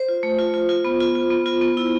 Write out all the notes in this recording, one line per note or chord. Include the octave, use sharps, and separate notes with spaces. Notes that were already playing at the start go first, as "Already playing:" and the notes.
Already playing: C5
F4
A3
F4
F4
F4
B3
F4
F4
B3
F4
B3
E4